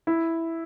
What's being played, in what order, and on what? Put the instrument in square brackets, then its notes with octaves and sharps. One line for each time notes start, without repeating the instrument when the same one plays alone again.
[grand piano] E4